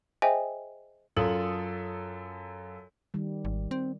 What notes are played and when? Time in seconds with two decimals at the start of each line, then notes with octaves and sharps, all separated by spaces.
0.22 G#4 C5 D#5 E5 G5 G#5
1.17 F#2 F4 A4 D#6 F#7
3.14 D#3 G3
3.45 G#1
3.71 C4